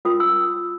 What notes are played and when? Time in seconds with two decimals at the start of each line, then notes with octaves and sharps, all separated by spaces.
0.05 C#4 F4 A#4 D#6
0.20 E6